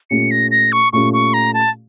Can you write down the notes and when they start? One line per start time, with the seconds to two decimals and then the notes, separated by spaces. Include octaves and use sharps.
0.10 A#2 A3 C#4 G4 C#7
0.31 A#6
0.51 A#6
0.72 C#6
0.93 A#2 A3 C#4 G4 C#6
1.13 C#6
1.34 A#5
1.54 A5